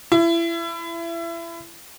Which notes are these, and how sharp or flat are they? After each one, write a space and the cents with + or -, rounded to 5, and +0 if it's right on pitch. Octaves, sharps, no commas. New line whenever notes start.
E4 +30